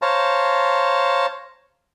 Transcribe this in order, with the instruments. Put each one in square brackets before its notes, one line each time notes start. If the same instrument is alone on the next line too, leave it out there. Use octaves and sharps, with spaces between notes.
[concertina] C5 C#5 F5 A5 A#5